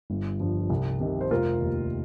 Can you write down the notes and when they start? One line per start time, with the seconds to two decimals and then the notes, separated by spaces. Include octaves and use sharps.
0.10 G1
0.40 G2 F3
0.70 C2
1.00 C3 D#3
1.21 C5
1.31 F1 F4 A#4
1.61 D#2 D#3